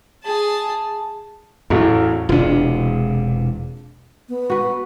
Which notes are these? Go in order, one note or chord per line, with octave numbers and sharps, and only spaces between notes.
G#4 A5
A1 E2 A2 F#3
E1 C3 D4 F4
B3
F#4 B4